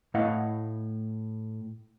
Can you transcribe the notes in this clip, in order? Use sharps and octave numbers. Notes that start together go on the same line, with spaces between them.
A2 A3 E4 D#5 F5 F#5